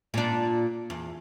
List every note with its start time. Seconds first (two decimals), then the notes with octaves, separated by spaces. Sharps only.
0.14 A#2 D4
0.90 E2